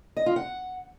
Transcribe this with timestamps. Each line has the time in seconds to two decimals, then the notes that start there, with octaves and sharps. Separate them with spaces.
0.17 D#5
0.26 F4
0.36 F#5